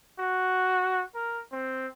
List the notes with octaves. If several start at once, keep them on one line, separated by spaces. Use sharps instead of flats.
F#4
A#4
C4